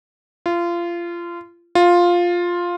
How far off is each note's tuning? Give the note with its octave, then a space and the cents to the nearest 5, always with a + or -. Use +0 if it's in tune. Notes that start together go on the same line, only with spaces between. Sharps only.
F4 -25
F4 +5